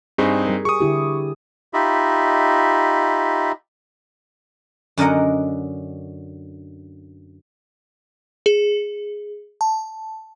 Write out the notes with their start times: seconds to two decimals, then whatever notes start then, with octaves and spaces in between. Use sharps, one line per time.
0.18 G2 C4 D#4 G#4
0.46 G3 A#4
0.65 G#4 C#6 D#6
0.80 D3 E4 G4
1.73 D#4 F4 G4 D#5 E5 B5
4.98 F#2 D3 A#4 D#5 F#5
8.46 G#4
9.61 A5